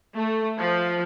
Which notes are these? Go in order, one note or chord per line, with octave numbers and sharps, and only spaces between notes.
A3
F3